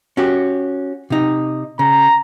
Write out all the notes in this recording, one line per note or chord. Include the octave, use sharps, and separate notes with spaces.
C#4 F#4 G4
C3 D#4
C#3 A#5